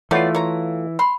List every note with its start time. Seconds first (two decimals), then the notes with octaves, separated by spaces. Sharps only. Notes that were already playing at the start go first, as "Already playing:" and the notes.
0.11 E3 A3 B3 F4 C#5 D5
0.35 C#5 A#5
0.99 B5 C6